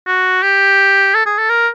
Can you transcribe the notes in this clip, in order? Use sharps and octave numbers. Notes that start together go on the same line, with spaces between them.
F#4
G4
A4
G#4
A4
A#4